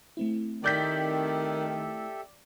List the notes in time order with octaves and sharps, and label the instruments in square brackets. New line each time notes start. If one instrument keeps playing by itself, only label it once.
[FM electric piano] A3 C4 E4
[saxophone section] D#3 [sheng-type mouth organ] G4 A4 E5 [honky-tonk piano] D5 G6 B6